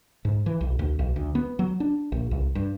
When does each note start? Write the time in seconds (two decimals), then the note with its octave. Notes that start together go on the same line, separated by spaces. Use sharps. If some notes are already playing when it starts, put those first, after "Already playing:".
0.25 G#2
0.46 E3
0.61 B1
0.79 D2
0.99 B1
1.16 D2
1.35 B3
1.59 F#3
1.80 D4
2.12 A#1
2.31 C2
2.55 G2